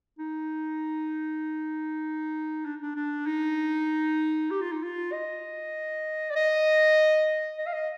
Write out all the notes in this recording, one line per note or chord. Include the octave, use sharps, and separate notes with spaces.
D#4
D4
D4
D4
D#4
G4
F4
D#4
F4
D#5
D5
D#5
D#5
F5
D#5